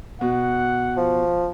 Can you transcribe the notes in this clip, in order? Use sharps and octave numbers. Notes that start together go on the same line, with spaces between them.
B2 F#5
F3